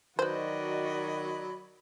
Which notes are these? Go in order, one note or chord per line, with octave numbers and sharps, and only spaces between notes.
D#3 F#3 F#4 B4 C5 D5 D#5 B5